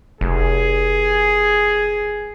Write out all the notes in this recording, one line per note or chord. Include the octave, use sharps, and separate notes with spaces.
F1 G#4